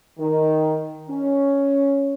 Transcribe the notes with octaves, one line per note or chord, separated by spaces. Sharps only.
D#3
C#4